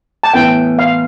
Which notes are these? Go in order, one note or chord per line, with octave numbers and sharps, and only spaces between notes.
A5
A2 E3 B3 E4 G5
F5